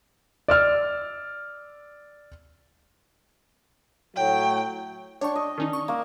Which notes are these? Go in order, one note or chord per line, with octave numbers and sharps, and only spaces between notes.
D5 E6 F6
A2 F#3 G5
D4 C#5 G5 C#6
D#5
D#3 C#4 D#4
C#6
A#3